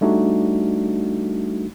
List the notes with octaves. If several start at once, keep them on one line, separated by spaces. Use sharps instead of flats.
G3 A3 D4 D#4 F#4